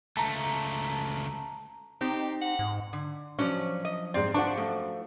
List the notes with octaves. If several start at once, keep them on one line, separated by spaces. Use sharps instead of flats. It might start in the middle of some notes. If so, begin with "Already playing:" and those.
C#2 A3 A5 A#5
C4 D#4 G4
F#5
G#2
D3
F3 F#3 C#4 D4 D5
D#5
G#2 C4 D5
F3 D4 F4 C5 F#5 A5 C#6
F#2 A3